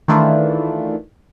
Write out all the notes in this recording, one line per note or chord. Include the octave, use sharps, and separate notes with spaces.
D#3 E3 A3 D4 E4 F4